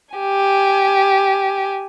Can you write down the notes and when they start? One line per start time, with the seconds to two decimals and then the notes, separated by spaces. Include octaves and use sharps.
0.15 G4 G#5